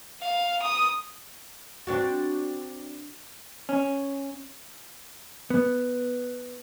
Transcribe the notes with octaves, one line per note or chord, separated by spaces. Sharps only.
F5
D#6
C4 D4 F#4
C#4
B3